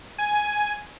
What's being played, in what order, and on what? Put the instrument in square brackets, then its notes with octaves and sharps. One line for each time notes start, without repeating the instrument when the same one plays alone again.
[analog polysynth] G#5